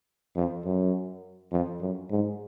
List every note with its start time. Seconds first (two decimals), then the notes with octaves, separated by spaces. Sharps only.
0.36 F2
0.65 F#2
1.52 F2
1.81 F#2
2.11 G#2